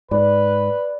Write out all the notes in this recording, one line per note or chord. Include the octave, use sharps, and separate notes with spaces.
G#2 B4 D5